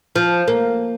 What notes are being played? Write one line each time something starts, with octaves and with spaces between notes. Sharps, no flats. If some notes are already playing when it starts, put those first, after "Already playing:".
F3
A#3